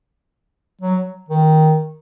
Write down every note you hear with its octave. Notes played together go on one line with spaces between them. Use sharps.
F#3
D#3